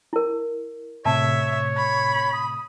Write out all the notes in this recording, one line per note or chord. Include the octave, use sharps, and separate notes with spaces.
E4 A#4
A2 C3 C#5 E5 A5
B5
D#6